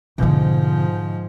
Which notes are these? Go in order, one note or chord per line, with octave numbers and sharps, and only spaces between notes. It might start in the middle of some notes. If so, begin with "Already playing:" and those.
G#2 B2 D3 F3